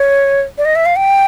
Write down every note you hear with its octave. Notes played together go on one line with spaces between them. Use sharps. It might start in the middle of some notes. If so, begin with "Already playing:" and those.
Already playing: C#5
D5
D#5
E5
F5
G5